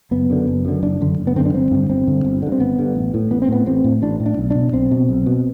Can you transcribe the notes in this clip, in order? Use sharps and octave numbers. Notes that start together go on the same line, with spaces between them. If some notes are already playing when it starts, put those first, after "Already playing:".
F#1 B3
F#2 D3
F#1
F#2 D3
F#1 D4
F#2 D3
F#1
B3
F#2 D3 C4
D4
G1 C4
G2 D3
G1 C4
G2 D3
G1
G2 D3
C4
G1 B3
G2 D3
A1
A2
A1 B3
C4
A2 B3
A1 C4
A2
A1 D4
A2
D4
B1
B2 D4
B1 C4
B2
B1
B2